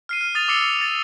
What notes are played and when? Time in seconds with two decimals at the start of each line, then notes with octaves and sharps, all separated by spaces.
0.09 F6 C7 D#7
0.21 F6
0.35 D#6 A6 F7
0.48 D6 E6 C7 C#7 G7
0.63 F7
0.81 A6